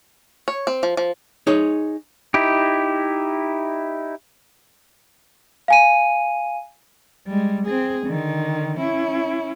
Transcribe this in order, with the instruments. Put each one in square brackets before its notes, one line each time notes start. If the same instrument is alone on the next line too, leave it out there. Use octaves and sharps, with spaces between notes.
[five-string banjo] C#5
C4
F3
F3
[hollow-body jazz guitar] D#4 G#4 C#5
[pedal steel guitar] D#4 E4 G4
[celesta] F5 G#5 D#7
[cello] G3 G#3
C4 G#4
D3 D#3
C#4 E4